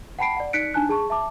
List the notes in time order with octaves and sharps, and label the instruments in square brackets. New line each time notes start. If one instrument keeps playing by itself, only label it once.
[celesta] F#5 G5 A5 B5 C7 D7
D5 F#5
D#4 D5 F#6 B6 C#7 D7
D4 D#4 G#5 A5 F#6
G#4 A5 C#6
E5 A5 D6